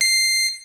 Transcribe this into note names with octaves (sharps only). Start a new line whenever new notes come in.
C7